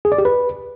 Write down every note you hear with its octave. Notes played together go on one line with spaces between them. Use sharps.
G#4
D5
G4
B4